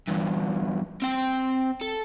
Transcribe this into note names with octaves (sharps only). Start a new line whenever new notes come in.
E2 G2
C4 G5
A4